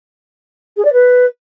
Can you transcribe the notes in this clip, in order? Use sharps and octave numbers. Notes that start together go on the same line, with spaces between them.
G#4
D5
B4